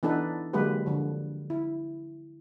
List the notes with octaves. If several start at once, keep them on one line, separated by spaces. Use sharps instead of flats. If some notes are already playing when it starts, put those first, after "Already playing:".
E3 B3 D4 D#4 A4 B4
D3 F#3 G#3 A#3 G4 B4
D3 F3
E4